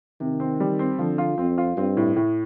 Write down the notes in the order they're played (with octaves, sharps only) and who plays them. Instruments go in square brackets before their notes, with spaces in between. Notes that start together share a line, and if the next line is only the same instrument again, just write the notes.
[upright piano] C3 [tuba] D#3
[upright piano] C4
G3
C4
[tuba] D3 [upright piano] F3
[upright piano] F4
[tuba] F2 [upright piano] C4
[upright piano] F4
[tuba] G2 [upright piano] C4
[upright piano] A2
A2